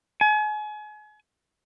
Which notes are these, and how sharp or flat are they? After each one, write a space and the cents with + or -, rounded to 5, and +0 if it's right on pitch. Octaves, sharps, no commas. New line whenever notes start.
G#5 +35